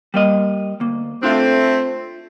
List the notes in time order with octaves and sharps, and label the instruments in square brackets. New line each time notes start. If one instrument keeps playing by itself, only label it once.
[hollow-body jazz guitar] G3 A#3 D#5
D2 A#3
[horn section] A3 C4 [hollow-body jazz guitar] D4 F4 A4